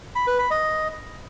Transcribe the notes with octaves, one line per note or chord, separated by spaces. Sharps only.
B5
B4
B5
D#5